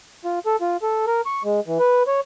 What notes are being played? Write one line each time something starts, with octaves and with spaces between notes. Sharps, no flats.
F4
A4
F4
A4
A#4
C#6
G#3
E3
B4
C#5